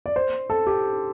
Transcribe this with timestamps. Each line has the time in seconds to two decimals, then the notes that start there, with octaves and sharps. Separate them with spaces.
0.06 D5
0.16 C5
0.50 A4
0.67 G4